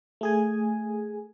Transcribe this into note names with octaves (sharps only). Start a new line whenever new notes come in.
A3 G#4 G#5